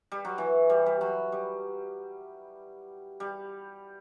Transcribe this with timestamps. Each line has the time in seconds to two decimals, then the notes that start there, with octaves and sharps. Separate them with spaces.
0.12 G3
0.25 F#3
0.38 E3
0.70 G3
0.86 G3
1.01 F#3
1.32 G3
3.20 G3